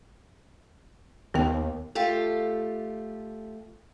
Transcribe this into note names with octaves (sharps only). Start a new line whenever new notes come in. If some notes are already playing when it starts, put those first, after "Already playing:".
D#2 B3 G5
A3 F4 G4